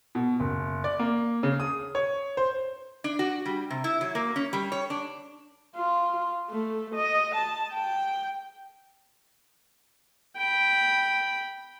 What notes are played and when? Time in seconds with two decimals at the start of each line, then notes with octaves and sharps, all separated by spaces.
0.15 B2
0.40 F#1
0.84 D5
0.99 A#3
1.43 C#3
1.60 D#6
1.95 C#5
2.37 C5
3.04 D4
3.19 F#4
3.46 G3
3.71 C3
3.84 E4
4.01 F#3
4.15 A#3
4.36 C#4
4.53 G3
4.72 C#5
4.90 D4
5.76 F4
6.50 A3
6.95 D#5
7.35 A5
7.73 G5
10.37 G5 B5